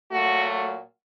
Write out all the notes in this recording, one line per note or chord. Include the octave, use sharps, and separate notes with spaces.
A#2 F#3 A3 F#4